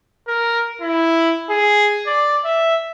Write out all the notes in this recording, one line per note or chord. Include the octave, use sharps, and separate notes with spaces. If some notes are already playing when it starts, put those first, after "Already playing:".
A#4
E4
G#4
D5
E5